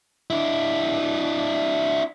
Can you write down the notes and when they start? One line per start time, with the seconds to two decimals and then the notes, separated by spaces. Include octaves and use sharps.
0.30 D4 E4